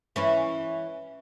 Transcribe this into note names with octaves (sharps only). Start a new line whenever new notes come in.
E3 C#4 E4